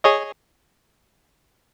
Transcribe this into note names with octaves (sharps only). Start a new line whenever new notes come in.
G#4 C#5 D#5